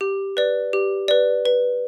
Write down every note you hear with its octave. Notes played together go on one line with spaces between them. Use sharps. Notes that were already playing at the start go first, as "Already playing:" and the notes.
G4
B4 D5
G4
B4 D5
B4